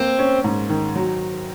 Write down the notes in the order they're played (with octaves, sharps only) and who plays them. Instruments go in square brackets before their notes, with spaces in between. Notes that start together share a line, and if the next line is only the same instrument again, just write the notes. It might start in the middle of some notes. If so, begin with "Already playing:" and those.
Already playing: [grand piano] A#3 [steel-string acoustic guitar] C4
[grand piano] C#4
G#2
D#3
F#3